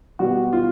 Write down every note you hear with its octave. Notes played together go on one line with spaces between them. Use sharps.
B2 G3 F#4
F4